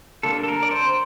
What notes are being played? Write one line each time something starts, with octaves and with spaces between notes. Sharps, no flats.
D3 G3 A#3 D4 A4
A4
A#4
D5
C5